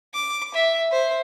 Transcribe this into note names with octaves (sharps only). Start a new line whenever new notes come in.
D6
E5
C5